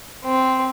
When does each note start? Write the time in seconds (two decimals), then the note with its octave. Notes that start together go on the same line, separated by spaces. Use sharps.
0.24 C4